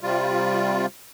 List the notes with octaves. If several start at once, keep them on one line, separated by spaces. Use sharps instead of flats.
C3 G3 F4